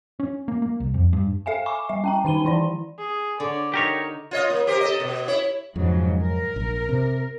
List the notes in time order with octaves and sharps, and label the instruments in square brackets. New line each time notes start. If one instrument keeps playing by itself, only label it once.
[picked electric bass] C#4
A#3
A#3
C2
F2
G2
[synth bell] A4 E5 F5 G#5
G#5 B5 C#6 D6
G3 E5
C#4 G5 A#5
D#3 D#4 D#7 G7
E3 E4 D5
[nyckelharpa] G#4
[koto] D3 [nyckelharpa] C#5 D5
[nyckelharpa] D#4 [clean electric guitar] G4 A#4 C#5
[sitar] F4 C#5 D#5
A#3
G4 A#4 C5
A4 D#5
B2
E4 C#5
[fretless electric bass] F2 [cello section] G#2 C#3 F#3
[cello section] A#4
[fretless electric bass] A#1
C3